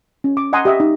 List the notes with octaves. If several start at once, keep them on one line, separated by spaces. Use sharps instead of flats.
C#4
D6
D#5 F#5 G#5 A#5 C6 D#6
G4 D#5 E5
D#4